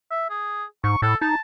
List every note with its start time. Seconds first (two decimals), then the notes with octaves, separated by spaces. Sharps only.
0.11 E5
0.30 G#4
0.84 G#2 C#6
1.02 A2 A4
1.22 D#4 A5